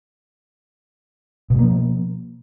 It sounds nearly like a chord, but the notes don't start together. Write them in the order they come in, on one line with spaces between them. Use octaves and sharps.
B2 G#3 A#3 F3